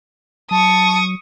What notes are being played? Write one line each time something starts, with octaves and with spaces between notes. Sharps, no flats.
F#3 A5 C#6 D#6